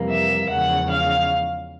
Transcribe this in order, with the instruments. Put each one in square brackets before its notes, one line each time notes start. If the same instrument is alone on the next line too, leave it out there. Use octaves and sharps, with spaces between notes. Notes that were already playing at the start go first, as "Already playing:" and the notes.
Already playing: [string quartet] F2 C3 E3 G3 A#3
E5
E2 C#3 F3 G#3 F#5
F5